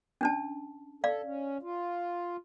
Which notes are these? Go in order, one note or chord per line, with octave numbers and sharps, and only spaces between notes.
C#4 D4 A5
A4 D5 F5
C#4
F4